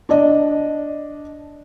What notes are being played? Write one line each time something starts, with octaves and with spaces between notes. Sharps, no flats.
D4 D5 D#5